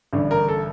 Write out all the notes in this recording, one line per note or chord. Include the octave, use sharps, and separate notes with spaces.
A1 G2 D3
A#4
A4